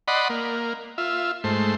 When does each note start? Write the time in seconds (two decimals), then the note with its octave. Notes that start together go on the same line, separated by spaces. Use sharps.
0.08 D5 D#5 F#5 B5 C6
0.30 A#3
0.98 F4 E5
1.44 G#2 A3 C5